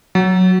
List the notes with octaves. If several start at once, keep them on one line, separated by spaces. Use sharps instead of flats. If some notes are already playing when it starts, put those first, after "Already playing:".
F#3